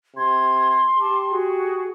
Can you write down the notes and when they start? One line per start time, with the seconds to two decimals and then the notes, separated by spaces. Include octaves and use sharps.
0.16 C3 C6 G#6
0.99 G4 A5 D6
1.30 F#4 G#4